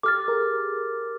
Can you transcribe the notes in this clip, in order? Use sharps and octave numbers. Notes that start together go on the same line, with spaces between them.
G4 A4 D6 F6 A6
G#4 A#4